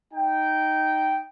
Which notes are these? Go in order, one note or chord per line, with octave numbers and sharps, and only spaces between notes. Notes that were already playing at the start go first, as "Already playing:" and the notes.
D#4 G5